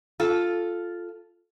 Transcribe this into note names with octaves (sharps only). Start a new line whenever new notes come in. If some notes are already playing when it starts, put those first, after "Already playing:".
F4 A4